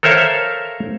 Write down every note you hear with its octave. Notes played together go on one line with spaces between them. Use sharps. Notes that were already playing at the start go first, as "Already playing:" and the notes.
A4 A#4 C5 C#5 E5 F5